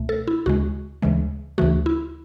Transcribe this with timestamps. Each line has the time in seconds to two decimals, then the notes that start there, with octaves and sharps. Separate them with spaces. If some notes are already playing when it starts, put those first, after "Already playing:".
Already playing: C#2 B2 A3
0.09 A4
0.28 E4
0.46 D2 C#3 G#3 F#4
1.02 D2 C#3 E3 G#3
1.58 D2 C#3 E3 A3 F#4
1.86 E4